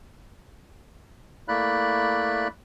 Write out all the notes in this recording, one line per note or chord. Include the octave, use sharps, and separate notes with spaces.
A3 A#3 E4 D5 B5 F#6